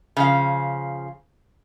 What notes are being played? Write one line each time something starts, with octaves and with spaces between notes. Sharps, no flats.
C#3 F3 F5